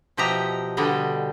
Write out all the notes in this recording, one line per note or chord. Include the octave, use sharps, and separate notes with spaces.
B2 F3 G4 D#5 E5 A#5
B2 D3 G3 D#5 G5